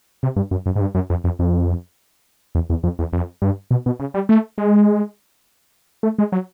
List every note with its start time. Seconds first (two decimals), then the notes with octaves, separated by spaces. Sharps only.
0.23 C3
0.36 G2
0.51 F#2
0.66 F#2
0.76 G#2
0.81 G2
0.95 F#2
1.10 F2
1.24 F2
1.39 F2
2.55 E2
2.70 E2
2.83 F2
2.99 E2
3.13 F2
3.42 G2
3.71 B2
3.86 B2
4.00 C#3
4.14 G3
4.29 A3
4.58 G#3
6.03 A3
6.18 G#3
6.32 F#3